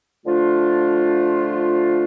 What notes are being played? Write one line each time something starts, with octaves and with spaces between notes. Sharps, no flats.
D3 F3 A3 D4 F4